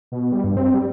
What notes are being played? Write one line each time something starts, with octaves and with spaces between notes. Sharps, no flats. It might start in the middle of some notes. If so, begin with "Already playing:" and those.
B2
G3
G2
C4
G3